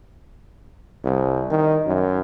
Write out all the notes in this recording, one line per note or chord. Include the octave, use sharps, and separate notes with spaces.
C2
D#3
F#2